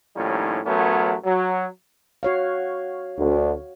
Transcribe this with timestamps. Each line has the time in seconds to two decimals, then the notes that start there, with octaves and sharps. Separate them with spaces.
0.15 D#2 A2 F3 G3 C#4 D#4
0.65 A1 F#3 A3 B3 C#4 A#4
1.24 F#3
2.23 F#4 C#5 F5
3.18 D2